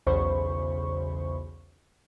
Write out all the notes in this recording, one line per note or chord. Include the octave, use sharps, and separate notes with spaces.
B1 E2 C#3 C5 B5 C#6